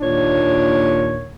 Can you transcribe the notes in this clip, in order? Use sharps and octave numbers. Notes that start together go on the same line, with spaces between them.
D#2 A#2 D4 C#5